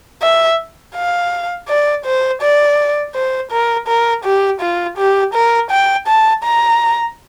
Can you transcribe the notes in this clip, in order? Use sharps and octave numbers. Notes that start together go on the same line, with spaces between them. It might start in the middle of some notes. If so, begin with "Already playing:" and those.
E5
F5
D5
C5
D5
C5
A#4
A#4
G4
F4
G4
A#4
G5
A5
A#5